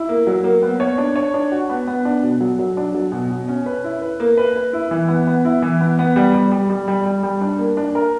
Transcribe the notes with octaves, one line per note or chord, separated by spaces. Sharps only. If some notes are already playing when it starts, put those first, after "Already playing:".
Already playing: E4
A#3
F#3
A#3
B3
C#5
D4
C#5
D4
F#4
B3
B3
D4
B2
F#3
F#3
D4
F#3
B2
B2
C#4
B4
E4
B4
A#3
B4
B4
E4
E3
B3
B3
E4
E3
B3
B3
G3
G3
G3
G3
G3
G3
G3
D4
A#3
D4
A#4